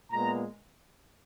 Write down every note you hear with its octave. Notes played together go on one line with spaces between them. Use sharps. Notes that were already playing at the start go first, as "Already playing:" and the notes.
A#2 G#3 B3 A#5